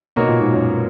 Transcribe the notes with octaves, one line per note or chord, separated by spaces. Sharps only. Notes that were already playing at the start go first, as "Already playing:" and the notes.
B2 A#3 D#4 F#4 A#4 C#5
A#2
G#2
F#2